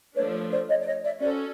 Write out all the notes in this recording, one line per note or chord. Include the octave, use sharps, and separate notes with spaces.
F3 A3 D4 B4 C#5
B4 C#5
C5 D5
C#5 D#5
D5
C#5 D#5
D5 E5
C#4 F#4 A4 C5 D5